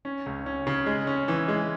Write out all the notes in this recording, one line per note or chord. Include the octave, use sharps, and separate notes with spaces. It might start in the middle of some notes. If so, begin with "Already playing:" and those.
C#4
C#2
C#4
C#3
G#3
C#4
E3
G#3